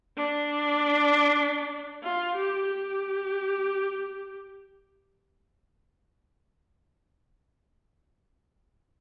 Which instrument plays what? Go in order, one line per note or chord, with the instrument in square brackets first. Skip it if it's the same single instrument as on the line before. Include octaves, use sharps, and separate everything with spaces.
[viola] D4
F4
G4
G4